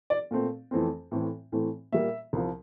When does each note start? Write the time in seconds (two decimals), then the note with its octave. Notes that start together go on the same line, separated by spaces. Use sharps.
0.10 D5
0.31 A#2 A3 C4
0.71 F2 E3 A3 C4
1.11 A2 E3 A3 C4
1.52 A2 E3 A3 C4
1.92 A#2 G3 A#3 E5
2.33 C2 C3 F3